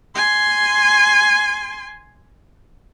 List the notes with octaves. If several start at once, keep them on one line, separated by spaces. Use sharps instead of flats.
G#5 C6